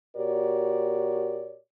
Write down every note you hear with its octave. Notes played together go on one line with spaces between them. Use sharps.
A#2 F#4 G4 A#4 C#5 D5